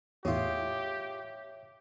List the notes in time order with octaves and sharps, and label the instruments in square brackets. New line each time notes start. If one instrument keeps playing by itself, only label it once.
[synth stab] E2 A2 [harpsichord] F4 G#4 [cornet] G4 [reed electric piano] C#5 E5